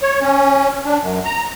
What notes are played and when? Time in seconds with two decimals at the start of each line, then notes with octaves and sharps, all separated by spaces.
0.02 C#5
0.21 C#4
0.85 D4
1.01 F#2
1.25 A#5